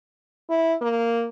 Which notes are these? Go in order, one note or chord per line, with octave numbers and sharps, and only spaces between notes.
E4
A#3